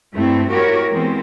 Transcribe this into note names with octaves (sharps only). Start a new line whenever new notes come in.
G2 A3 C4 E4
E4 F#4 G4 A#4 C#5
E3 G#3 B3 C4